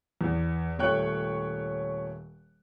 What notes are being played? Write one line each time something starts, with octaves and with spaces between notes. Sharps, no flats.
E2
D#1 A3 C#5 G5 F#6